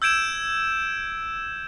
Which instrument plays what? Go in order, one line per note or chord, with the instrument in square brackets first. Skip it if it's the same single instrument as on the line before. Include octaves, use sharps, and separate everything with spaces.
[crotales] E6 G6 G#6 D7 E7